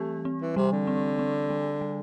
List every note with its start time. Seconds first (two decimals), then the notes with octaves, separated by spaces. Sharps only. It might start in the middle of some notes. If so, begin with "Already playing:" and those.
Already playing: E3 G3 A3 C4 G4
0.25 C4
0.41 E3
0.56 C3 G3
0.72 D3
0.87 C4
1.19 C4
1.50 G3
1.81 G3